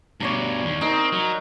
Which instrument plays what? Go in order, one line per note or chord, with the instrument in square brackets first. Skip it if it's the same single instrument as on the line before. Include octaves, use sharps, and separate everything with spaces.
[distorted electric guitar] G2 B2 [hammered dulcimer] C#5 D5 A#5
[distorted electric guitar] D#2
[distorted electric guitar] C4 [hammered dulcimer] D#4 A#4
[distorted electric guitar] F#3